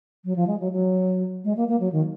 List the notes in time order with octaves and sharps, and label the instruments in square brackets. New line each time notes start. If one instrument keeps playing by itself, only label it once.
[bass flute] F#3
F3
G#3
F#3
F#3
G#3
A#3
A#3
F#3
D#3